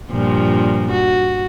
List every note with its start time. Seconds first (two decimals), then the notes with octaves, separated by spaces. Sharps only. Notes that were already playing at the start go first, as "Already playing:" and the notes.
0.11 G2 A#2 F3
0.91 F#4